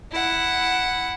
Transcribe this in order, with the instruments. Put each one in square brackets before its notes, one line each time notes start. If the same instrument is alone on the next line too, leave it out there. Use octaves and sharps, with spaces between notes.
[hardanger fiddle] E4 F#5